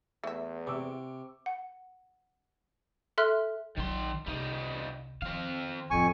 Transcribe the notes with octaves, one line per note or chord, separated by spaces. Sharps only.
E2 A3 E5
C3 C#6 D6 E6
F#5
A4 E5 C6 F6 F#6
A#1 D#3 F#3 C6
C2 G3 D#4
D#3 C4 F5
F2 A2 F3 G#5 C#6